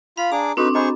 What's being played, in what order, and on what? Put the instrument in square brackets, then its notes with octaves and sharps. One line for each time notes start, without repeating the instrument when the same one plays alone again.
[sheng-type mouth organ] F4 B5 [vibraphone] F5
[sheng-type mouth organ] D4 G#4 D6 [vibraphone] A#5
[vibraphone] C4 D4 D6 [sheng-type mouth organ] D#4 B4 [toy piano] F#4 G4 A4
[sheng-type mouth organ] G#4 C5 C#6 [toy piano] D#5 A#5 B5